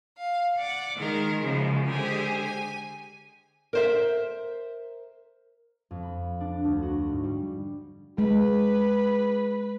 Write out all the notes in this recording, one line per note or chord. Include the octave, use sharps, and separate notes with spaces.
F5
D5 F#5
D#3 G#3 G#4 A#4
F#2 C#3 F3 G#3
D3 G#3 G4 G#4 C5
G#5
A#4 C5 E5
F2
B5
D4
D2
F#4
G#2
G3
G#3 B4